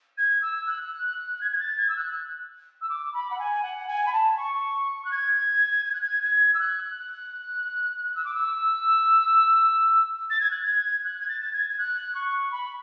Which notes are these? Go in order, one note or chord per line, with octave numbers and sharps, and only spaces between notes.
G#6
E6
F#6
F#6
G#6
G#6
A6
G#6
E6
F#6
E6
D6
B5
F#5
G#5
F#5
G#5
B5
A5
C#6
F#6
G#6
G#6
F#6
G#6
G#6
E6
F#6
F#6
E6
D6
E6
A6
G#6
F#6
G#6
F#6
G#6
A6
A6
G#6
G#6
F#6
C#6
B5